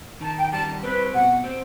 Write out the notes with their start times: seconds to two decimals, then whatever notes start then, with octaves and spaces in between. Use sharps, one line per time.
0.21 D#3 A5
0.37 G5
0.52 G3 A5
0.83 C4 B4
1.13 B2 F#5
1.44 C4